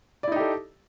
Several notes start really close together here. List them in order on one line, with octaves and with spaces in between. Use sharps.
D5 E4 D#4 G4 A4